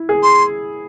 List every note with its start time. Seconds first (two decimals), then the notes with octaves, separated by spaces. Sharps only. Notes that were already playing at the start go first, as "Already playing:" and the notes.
Already playing: E4
0.09 G#4
0.23 C6